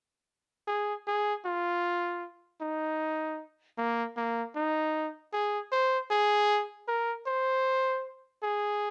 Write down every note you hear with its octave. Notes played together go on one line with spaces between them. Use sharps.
G#4
G#4
F4
D#4
A#3
A#3
D#4
G#4
C5
G#4
A#4
C5
G#4